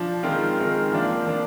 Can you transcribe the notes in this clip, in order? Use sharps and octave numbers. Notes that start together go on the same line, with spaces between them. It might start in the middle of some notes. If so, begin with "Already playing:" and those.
Already playing: F3 D4
D#3 G#3 C4 F4
D#3 G#3 C4 F4
F3 A#3 D4 F4
F3 A#3 D4 F4